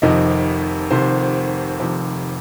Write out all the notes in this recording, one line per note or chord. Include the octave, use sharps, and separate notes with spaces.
F1 F2 C3 D#3 D#5
F1 F2 C3 D#3 C5
F1 F2 C3 D#3